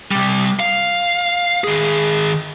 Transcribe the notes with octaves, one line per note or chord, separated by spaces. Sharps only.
C3 G3
F5
D#3 G#4